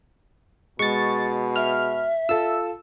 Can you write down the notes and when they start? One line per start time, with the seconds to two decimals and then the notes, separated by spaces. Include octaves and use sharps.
0.79 B2 G#3 C#6 A6
1.56 E5 F6
2.29 F4 A4 E6